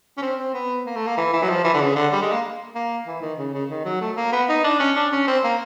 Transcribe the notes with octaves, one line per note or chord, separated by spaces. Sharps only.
C#4
C4
C4
B3
A#3
A3
A#3
E3
E3
F#3
F3
E3
D3
C#3
D3
G3
G#3
A#3
A#3
E3
D#3
C#3
C#3
D#3
F#3
A3
A#3
B3
D#4
D4
C#4
D4
C#4
C4
A#3